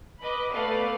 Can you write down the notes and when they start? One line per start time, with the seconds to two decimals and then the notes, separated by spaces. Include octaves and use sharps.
0.21 B4 D#5 B5 D6
0.50 A3 B3 B4 D5 F5